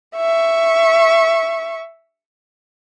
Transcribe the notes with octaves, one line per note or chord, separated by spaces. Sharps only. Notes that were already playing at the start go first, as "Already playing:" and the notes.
E5 C#6